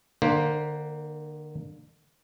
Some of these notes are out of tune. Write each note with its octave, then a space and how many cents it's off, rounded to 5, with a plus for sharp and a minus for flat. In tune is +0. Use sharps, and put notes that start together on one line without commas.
D3 +35 A#3 +0 C5 +10